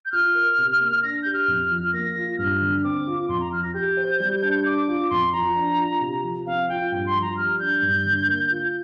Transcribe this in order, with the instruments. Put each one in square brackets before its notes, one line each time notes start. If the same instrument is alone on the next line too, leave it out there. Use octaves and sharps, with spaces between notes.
[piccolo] G6
[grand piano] F4 [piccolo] F6
[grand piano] A#4
C3
A#3
[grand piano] D4 [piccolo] A#6
[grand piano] G4 [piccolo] G6
[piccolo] F6
[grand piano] F2
F3
[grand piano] A#3 [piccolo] A#6
[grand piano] F4
[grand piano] G2 [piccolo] F6
[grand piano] D3
[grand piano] C4 [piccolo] D6
[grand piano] F4
[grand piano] F2 [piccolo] C6
[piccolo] A#5
[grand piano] F3 [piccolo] F6
[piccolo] A#6
[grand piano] G4 [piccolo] G6
[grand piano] C5
G3
D4
[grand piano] D4 [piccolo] D6
[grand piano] F4
[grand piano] F2 [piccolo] C6
[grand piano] F3 [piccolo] A#5
[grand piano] D4
F4
C3
F3
[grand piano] C4 [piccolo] F5
[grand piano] F4 [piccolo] G5
[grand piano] G2 [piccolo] G5
[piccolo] C6
[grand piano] F3
[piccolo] A#5
[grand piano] G3 [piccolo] F6
[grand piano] D4 [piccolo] G6
[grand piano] G2
D3
A#3
F4